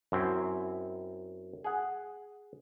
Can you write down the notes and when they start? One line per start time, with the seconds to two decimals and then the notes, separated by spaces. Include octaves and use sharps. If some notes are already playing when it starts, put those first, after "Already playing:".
0.12 F#2 C4 E4
1.64 G#4 F#5